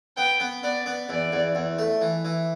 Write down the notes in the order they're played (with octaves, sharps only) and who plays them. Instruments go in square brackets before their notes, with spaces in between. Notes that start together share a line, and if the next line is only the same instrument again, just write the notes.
[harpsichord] B3 [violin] G5
[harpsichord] B3
[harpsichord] B3 [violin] D5
[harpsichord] B3
[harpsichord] E2 [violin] D5
[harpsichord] E2
E2
A3
E3
E3